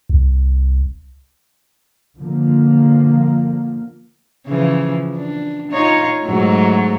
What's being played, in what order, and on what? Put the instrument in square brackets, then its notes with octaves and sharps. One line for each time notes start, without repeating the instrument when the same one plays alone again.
[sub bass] C2
[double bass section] D3 F3 A#3
[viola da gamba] C#3 E3 F3
D4
D#4 F4 C#5
G#2 F#3 A3